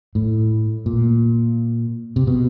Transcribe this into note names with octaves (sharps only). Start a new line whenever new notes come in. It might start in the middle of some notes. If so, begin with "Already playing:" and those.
A2
A#2
C3
B2